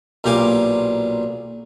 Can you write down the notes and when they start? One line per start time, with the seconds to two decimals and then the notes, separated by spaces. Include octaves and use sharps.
0.24 B1 A#2 G4 F5 G#5 D6